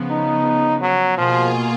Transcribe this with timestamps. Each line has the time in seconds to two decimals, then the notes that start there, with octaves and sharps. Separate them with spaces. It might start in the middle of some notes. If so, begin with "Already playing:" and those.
Already playing: C#3 F3 B3
0.11 D#4
0.82 F#3
1.17 B2 F3 A#3 F4 G#4